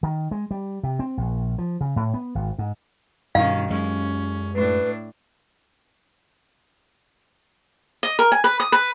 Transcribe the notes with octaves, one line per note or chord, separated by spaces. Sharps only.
D#3
G#3
G3
C3
C4
A#1
F3
C#3
A2
B3
G#1
G#2
G2 B2 D#3 C#4 F5
F#2 G#3 C#4
A2 D4 B4
D#5
A#4
G#5
B4
D#6
B4